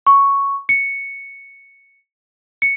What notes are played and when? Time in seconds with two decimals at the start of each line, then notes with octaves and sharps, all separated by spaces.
0.07 C#6
0.69 C#7
2.62 C#7